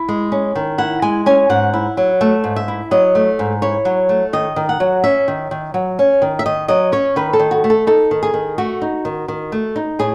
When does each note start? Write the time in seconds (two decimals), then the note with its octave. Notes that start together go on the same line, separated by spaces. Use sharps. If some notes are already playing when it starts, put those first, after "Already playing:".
Already playing: E4
0.09 G#3
0.32 C#4
0.55 D#3
0.78 E4 F#5
1.02 G#3 G#5
1.26 C#4 G#5
1.50 G#2 F#5
1.74 E4
1.97 F#3
2.21 A3 E5
2.44 G#2
2.56 E5
2.68 E4
2.91 F#3 D#5
3.15 A3
3.39 G#2
3.62 E4 C#5
3.85 F#3
4.09 A3
4.33 D#3 D#5
4.56 D#3
4.69 F#5
4.80 F#3
5.04 C#4 E5
5.28 D#3
5.51 D#3
5.74 F#3
5.99 C#4
6.22 D#3
6.39 E5
6.46 D#3 D#5
6.68 F#3 D#5
6.92 C#4 C#5
7.16 D#3 B4
7.33 A4
7.39 D#3
7.51 F#4
7.64 A3
7.70 A4
7.87 D#4 A4
8.11 D#3
8.23 G#4
8.34 D#3
8.58 A3 F#4
8.82 D#4
9.05 D#3
9.28 D#3
9.52 A3
9.76 D#4
9.99 A2 G#4